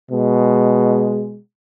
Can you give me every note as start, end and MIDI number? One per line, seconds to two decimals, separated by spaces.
0.11 1.38 47
0.11 1.38 56